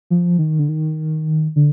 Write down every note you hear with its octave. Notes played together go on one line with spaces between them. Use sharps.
F3
D#3
D3
D#3
D3